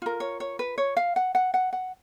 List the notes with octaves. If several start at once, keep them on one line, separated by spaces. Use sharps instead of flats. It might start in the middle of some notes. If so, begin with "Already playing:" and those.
F4 A#4
C#5
C#5
B4
C#5
F5
F#5
F#5
F#5
F#5